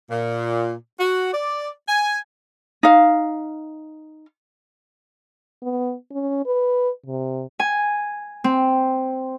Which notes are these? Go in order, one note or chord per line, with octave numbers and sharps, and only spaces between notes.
A#2
F#4
D5
G#5
D#4 F5
B3
C#4
B4
C3
G#5
C4